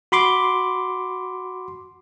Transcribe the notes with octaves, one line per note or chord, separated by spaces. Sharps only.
F#4 B5 C6 D6